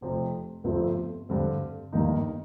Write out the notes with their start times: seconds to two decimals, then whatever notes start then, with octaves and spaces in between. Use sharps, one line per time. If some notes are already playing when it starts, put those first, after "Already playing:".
0.01 F1 F2 C3
0.64 G1 G2 F3 A3 C4
1.29 G2 D3 G3 C4
1.93 G1 G2 D#3 A#3 D#4